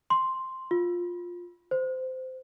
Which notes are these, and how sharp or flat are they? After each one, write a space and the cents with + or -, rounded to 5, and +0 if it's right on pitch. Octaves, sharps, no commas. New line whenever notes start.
C6 +0
F4 +10
C5 -20